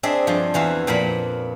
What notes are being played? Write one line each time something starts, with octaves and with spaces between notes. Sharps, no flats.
C4 D4 G#4 D#5 E5
G2 F3
E2 E3 F#4 F5
F2 A#2 A#4 B5